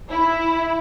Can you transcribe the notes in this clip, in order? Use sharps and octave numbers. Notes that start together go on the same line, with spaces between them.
E4